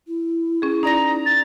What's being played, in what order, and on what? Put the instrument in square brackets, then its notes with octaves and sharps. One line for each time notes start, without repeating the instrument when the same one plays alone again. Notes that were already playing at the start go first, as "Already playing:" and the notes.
[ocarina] E4
[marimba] C#4 G#4
[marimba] D#4 D5 A#6 [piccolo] A#5
[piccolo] A6